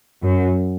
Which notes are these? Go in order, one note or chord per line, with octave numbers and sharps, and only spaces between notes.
F#2